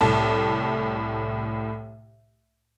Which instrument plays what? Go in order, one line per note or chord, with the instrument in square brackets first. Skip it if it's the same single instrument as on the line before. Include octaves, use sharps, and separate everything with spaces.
[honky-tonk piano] C2 A2 A5